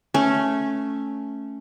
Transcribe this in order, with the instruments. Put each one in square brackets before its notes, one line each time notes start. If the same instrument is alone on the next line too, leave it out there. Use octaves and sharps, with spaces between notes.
[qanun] A3 C#4